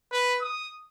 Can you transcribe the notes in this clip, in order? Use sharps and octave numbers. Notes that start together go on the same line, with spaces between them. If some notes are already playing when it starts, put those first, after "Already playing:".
B4
D#6